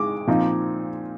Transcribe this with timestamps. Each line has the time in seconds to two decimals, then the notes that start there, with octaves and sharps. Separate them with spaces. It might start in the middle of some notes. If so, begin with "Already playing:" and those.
Already playing: D#3 G#3 D6
0.27 A#2 F3 C4 D#4